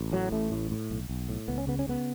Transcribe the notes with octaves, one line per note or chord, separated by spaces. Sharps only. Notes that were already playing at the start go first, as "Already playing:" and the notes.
Already playing: A1
A2 F#3
A1 A3
A2
A2
B1
B1
A2
C#2 B3
C#4
C#3 B3
C#4
C#3 B3